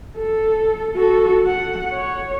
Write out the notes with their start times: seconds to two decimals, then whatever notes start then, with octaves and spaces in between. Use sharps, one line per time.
0.18 A4
0.96 F#4 A4
1.47 F#5
1.93 C#5